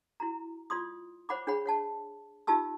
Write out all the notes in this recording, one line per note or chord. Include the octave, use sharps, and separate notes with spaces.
E4 F#4 A#5
F4 D5 C6 D#6
C5 C#5 F#5 B5 D6
D4 G#4 C#5 F#5 B5
C#5 F#5 A5
D#4 F4 G4 A5 E6